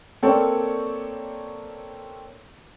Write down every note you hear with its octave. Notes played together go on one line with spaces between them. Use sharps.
A#3 C4 A4 A#4 C#5 D5